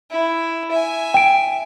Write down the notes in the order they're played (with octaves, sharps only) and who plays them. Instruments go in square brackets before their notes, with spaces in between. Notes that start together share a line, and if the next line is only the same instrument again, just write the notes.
[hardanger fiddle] E4
E5 G#5
[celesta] G5 D7